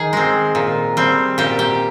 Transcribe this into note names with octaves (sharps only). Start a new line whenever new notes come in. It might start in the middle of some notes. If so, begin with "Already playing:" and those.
Already playing: D#3 G#4
G#3 C4
A#2
G3 C4
A#2 G4
G4